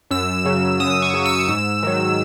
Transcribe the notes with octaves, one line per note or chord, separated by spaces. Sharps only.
F#2 E6
C#3 F#3
F#2 D#6
C#6
C#3 F#3
E6
G#2
D#3 F#3